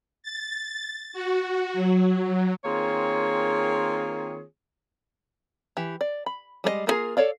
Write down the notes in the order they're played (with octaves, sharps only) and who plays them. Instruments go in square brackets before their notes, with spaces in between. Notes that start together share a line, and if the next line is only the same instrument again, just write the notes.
[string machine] A6
F#4
F#3
[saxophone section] D#3 A#3 C4 F4 G#4 C#5
[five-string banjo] E3 G4
D5
B5
G3 G#3 C5 D#5
A#3 B3 F4 G#4 A#4
A4 C#5 D5 F5